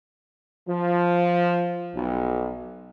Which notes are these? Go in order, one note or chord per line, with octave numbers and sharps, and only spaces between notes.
F3
B1